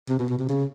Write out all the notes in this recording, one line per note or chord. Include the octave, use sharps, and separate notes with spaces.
C3
B2
B2
C3
C#3